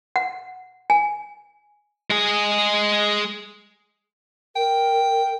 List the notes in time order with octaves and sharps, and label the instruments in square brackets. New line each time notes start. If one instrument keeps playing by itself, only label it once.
[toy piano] F#5
G#5
[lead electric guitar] G#3 G#4
[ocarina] A#4 [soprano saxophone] G5